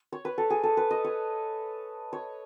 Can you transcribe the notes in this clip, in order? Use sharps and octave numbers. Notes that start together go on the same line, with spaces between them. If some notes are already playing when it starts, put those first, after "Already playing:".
Already playing: D#5
C#5
B4
A4
G#4
A4
B4
D#5
C#5
C#5